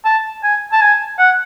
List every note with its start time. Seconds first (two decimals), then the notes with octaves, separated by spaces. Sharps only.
0.05 A5
0.44 G#5
0.72 A5
0.82 G#5
1.19 F#5